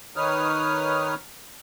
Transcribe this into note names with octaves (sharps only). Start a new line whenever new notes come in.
D#3 D#4 B4 C#5 D#6 F6